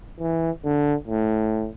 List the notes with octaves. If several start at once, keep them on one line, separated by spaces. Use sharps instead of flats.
E3
D3
A2